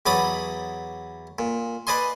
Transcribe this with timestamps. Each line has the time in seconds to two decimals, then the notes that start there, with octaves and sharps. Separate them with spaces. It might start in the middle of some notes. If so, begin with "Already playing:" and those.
0.06 E2 F#3 D5 B5 D6 D#6
1.39 A#2
1.87 B4 D5 D#5 G#5 C6